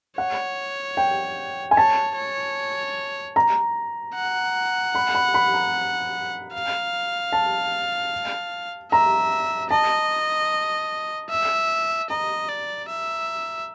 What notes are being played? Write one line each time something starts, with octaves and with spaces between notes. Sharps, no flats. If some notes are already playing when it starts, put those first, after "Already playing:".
C#5 F#5
G5
G#5
C#5 A5
C#5
A#5
F#5
B5
B5
B5
A#5
F5
A5
E5 A#5
D#5 A5
E5
D#5 A#5
D5
E5